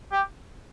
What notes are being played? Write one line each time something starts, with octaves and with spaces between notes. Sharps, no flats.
G4